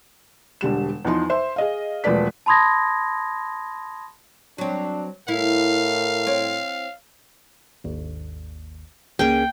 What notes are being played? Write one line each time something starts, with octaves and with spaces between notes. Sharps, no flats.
E1 D3 G3 E7
E2 F3 D#4 C6
C5 E5 C6
G#4 D#5 F5
E1 F3 A3 B4 D5 B6
A5 B5 C6 D#6 G#6 A#6
F#3 C4 D4
A2 E4 A#4 F5
C4 C#5
G#1 D#2
C#2 A#3 C#4 G#4 G5